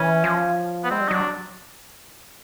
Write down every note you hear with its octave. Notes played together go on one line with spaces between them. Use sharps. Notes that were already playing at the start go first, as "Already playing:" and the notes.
Already playing: E3 C#4
F3
B3
G#3 C4
G3
D#4
F#3 D4